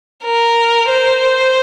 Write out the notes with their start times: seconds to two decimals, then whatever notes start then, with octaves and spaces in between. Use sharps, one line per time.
0.24 A#4
0.89 C5